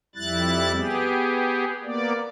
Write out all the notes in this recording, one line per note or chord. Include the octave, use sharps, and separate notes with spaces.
F2 G3 E4 F#6 A6
B3 G4 G#4
A#3 B3 D5